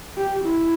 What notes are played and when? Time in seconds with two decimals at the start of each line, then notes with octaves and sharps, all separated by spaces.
0.17 G4
0.45 E4